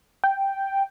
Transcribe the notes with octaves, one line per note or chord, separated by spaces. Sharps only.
G5